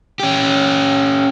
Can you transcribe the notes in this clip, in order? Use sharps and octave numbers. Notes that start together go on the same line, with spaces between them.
C#4 G4